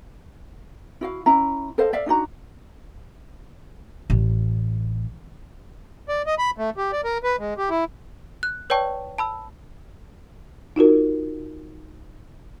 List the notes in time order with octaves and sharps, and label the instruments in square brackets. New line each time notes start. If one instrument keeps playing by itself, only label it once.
[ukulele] E4 F#4 F5
C#4 E4 E5 A#5
A4 C5 D#5 F5
D5 E5 F5
D4 D#4 F#4 A#5
[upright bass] A1
[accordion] D5
D#5
B5
A3
G4
D5
A#4
B4
G#3
G4
E4
[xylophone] F#6
B4 C#5 D5 G5 A5 C#6
A5 B5 E6
[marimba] D#4 F4 F#4 A#4